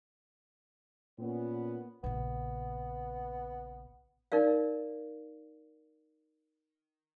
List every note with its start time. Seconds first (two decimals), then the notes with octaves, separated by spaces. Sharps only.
1.18 A#2 B3 C#4
2.04 A#1 C#3 B3
4.32 D#4 A#4 D5 F5